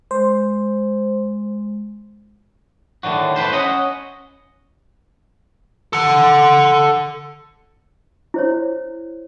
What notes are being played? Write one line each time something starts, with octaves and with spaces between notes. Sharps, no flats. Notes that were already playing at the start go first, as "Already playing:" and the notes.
G#3 C5
A2 D3 D#3 F#3 F#4
A2 A3 B4 C5
C#4 C#5 D#5 F#5
A4 F#5
E4 C5 C#5